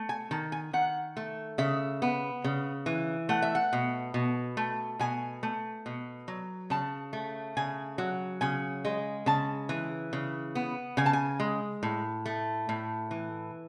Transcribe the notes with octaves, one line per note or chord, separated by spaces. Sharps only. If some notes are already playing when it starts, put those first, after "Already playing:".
Already playing: A3
G#5
D#3 A5
G#5
D#3 F#5
A3
C#3 E5
B3
C#3
E3
A3 F#5
E5
F#5
B2
B2
A3
B2 G#5
A3
B2
F#3
C#3 A5
A3
C#3 G#5
F#3
C#3 G#5
G#3
C#3 A5
E3
C#3
B3
C#3 G#5
A5
G#5
G#3
A2
A3
A2
E3